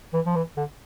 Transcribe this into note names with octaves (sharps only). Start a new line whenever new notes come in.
E3
F3
E3
D3